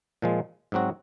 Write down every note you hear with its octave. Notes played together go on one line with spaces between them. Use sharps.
A#2 F3 G#3
G#2 F#3 C4 F#4